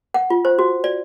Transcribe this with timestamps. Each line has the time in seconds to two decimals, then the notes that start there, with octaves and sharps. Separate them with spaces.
0.14 F#5
0.30 F4
0.45 C5
0.59 F#4
0.84 D5